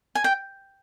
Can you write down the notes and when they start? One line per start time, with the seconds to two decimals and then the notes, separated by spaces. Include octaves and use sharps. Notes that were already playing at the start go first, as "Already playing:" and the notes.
0.15 G#5
0.24 G5